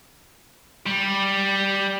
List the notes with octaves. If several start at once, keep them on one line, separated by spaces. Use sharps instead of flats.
G3